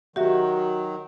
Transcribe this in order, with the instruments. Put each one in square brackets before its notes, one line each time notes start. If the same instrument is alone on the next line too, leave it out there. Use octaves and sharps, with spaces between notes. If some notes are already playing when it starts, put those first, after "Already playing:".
[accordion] D#3 F#3 [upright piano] F#4 [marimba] G4 E5